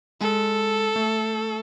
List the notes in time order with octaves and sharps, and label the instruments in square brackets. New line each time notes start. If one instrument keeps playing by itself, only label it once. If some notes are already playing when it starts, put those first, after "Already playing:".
[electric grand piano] G#3 [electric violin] A4
[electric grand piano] A3